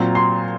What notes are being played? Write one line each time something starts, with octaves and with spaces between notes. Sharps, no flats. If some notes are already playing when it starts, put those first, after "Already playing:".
Already playing: A#2 F#3 C4 A#5
C6